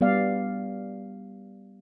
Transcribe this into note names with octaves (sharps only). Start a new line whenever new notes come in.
G3 B3 D5 F5